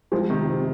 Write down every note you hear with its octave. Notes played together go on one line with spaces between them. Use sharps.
F3 G#3
C3 D#3
C3